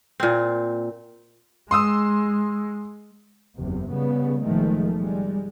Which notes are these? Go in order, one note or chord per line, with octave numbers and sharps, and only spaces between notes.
A#2 C4
G#3 C6 D#6 E6
F#1 E2 C3
C#3 G3 B3
F#1 B2 D#3 F3 G#3 A3
G3 G#3